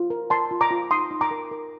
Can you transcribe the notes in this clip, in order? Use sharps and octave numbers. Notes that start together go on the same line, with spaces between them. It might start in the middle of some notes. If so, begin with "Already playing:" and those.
Already playing: F4
A#4
A#4 A5 C6
F4
A#5 D6
F4
D#4 C6 D#6
D#4
A#5 D6
A#4
A#4